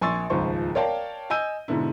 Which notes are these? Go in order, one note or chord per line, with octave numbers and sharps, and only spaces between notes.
A#1 G#5 C6 C#6 E6 A6
D#1 C#2 G#2 F3 C5 C#6
A#4 C#5 D5 F5 G5 A5
D#5 G#5 E6 G6 D#7
G#2 B2 D3 E4